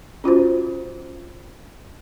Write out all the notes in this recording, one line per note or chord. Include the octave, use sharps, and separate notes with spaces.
C#4 F4 F#4 C5